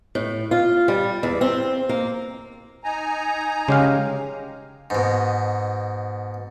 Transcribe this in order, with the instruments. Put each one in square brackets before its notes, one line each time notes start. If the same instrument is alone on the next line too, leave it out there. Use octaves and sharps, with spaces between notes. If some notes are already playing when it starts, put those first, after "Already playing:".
[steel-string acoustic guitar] A2
F4
G3
E2
C4
A#3
[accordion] D#4 G#5 A#5
[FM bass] C#3 [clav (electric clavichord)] G#3 G4 F5 [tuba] C#4
[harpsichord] G#2 B2